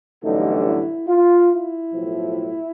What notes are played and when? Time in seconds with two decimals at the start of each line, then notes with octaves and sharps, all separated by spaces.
0.23 A1 G2 D3 F#3 A3 D#4
0.66 E4
1.08 F4
1.51 E4
1.93 B1 A2 F3